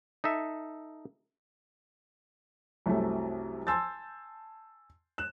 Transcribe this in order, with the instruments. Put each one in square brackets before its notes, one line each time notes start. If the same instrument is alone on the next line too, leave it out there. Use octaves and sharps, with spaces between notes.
[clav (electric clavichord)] D#4 A4 E5
[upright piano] C2 F#2 C3 F#3 A3
G#5 A5 C6 E6 G6 A6
F#6 E7